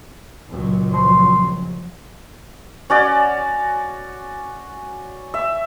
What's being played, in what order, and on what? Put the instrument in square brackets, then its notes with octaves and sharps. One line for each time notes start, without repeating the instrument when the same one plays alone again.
[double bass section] C#2 A#2 F#3
[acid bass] F3 [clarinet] C6
[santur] C#4 F#4 D5
E5